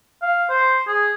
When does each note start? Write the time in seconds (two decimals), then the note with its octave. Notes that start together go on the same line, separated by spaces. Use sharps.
0.22 F5
0.50 C5
0.87 G#4